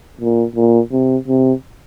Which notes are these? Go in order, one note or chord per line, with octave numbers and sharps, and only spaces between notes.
A#2
A#2
C3
C3